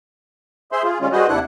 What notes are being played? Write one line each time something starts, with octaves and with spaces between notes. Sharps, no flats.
G#4 C5 E5 C6
F4 G#4
D#3 G3 G#3 C#4 F4
G3 F#4 G#4 B4 C5 D#5
D#2 C3 D4 E4 F#5 F#6